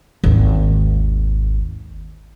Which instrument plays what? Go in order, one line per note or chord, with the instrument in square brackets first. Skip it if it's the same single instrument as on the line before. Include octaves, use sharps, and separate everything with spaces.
[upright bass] G#1 D#2